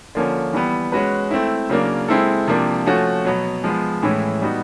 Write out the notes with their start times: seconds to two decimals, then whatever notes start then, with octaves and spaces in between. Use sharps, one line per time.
0.15 D3 F3 A#3 C#4
0.53 E3 G3 B3
0.92 G#3 C#4 F#4 B4
1.31 A3 C4 E4
1.70 C#3 F#3 A#3 D4
2.08 G#3 C4 E4 A4
2.47 C3 F3 A#3 D4
2.86 F3 A3 C#4 F#4
3.25 B2 F#3 B3
3.64 F3 G#3 B3
4.03 A2 E3 G#3 C#4 E4
4.41 G3 B3 D#4 F#4